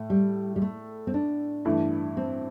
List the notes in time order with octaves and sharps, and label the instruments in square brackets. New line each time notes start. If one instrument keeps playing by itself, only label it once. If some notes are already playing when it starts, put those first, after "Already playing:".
Already playing: [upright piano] A2 A3
[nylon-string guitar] G3
G3
A3
C4
D4
[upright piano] G2 E3 A3 E4
[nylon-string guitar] C4